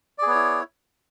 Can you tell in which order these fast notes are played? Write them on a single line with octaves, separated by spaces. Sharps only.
D5 G#4 B3 C#5 E4